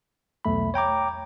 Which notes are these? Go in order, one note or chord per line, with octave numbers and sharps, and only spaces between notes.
B1 E2 A3 B5
C#5 G5 A#5 D6